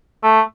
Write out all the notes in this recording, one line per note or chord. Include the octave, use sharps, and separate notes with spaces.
A3